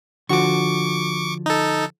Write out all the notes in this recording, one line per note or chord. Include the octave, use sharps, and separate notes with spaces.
D3 F3 F#4 C#6 D6
D#4 A4